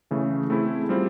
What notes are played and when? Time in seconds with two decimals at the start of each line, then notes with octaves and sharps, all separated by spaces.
0.11 C#3 E3 A3
0.50 A3 C4 E4 G#4
0.89 G3 C4 F4